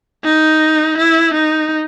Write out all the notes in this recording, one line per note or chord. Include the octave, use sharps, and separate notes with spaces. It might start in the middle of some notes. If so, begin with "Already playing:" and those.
D#4
E4
D#4